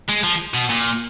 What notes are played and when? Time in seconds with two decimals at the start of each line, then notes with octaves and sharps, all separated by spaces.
0.09 G#3
0.24 F3
0.54 B2
0.69 A#2